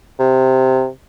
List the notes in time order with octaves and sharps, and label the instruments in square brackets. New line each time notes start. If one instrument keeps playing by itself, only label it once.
[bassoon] C3